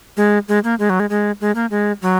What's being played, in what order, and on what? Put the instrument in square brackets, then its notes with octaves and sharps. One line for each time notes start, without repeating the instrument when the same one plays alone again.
[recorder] G#3
G#3
A#3
G#3
F#3
G#3
G#3
G#3
A#3
G#3
F#3